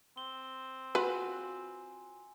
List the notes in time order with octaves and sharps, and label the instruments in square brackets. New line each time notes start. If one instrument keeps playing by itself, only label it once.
[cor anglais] C4 [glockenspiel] G7
[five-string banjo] F4 F#4 [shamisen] B4 [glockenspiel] G#5